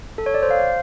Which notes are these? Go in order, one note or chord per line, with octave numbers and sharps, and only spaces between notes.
A4
C#5
D5
C5
F5